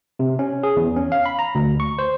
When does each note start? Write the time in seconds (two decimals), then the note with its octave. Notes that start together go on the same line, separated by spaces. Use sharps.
0.19 C3
0.39 C#4
0.63 G#4
0.76 E2
0.97 C#4
1.12 F5
1.26 B5
1.39 A#5
1.55 D2
1.80 C#6
1.99 C5